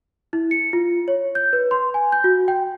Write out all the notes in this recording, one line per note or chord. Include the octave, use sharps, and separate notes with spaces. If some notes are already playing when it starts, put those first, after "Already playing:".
E4
C#7
F4
C#5
G6
B4
C6
G#5
G6
F#4
G5